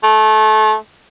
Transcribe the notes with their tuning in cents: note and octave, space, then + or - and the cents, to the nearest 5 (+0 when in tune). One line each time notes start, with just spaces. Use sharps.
A3 -25